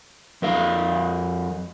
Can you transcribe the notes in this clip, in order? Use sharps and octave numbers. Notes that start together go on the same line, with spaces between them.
F2 A#4 F5